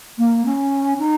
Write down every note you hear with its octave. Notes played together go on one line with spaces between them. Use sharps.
A#3
C#4
D#4